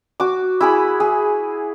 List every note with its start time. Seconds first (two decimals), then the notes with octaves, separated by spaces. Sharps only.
0.20 F#4 D6
0.61 E4 G#4 B5
1.00 G#4